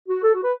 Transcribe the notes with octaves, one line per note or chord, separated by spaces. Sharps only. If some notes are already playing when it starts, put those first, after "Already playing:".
F#4
A4
F#4
B4